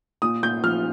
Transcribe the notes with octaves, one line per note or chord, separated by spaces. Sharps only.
A#2 D#6
A#2 G6
F3 F6